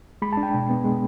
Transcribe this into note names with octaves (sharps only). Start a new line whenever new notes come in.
G#3 B5
A5
D4
G5
B2
B3
G#3